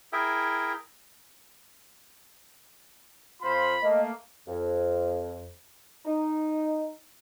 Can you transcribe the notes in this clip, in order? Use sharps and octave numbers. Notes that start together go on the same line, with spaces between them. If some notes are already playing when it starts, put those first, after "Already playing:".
E4 G#4 A#4 E5 G5
F2 F4 C5 B5
A3 A#3 D#5
F2
D#4